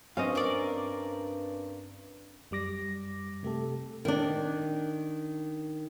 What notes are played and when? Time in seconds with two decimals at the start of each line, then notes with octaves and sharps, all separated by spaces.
0.17 G2 C4 C#4 C5 D#5 F5
0.35 A#4 D5
2.51 F#2 G3 D6 A#6
3.43 C3 A3 G4 A4
4.05 D#3 D4